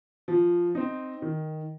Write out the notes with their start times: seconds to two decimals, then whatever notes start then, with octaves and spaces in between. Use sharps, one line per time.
0.28 F3
0.75 C4 D#4
1.22 D#3